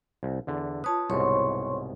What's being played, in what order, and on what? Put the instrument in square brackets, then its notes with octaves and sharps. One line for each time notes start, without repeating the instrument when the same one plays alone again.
[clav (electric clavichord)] C2
E2 D3
[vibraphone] F4 A5 D#6 [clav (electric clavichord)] B4 C#5
[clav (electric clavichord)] C2 G#2 B2 [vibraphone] C#5 C6 C#6